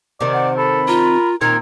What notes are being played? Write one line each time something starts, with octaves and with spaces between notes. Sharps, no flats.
C3 D#3 D5
F#5
A4 B5
F4 A#4
A#2 D#3 C4 D#4 A#5 G#6